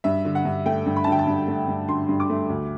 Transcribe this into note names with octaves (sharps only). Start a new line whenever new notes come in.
G2 E5
D3
F#5
G2
A3 G5
G2
B5
A5
D3
G5
A5
G2
A3
G2
D3 C6
G2
D6
A3
D2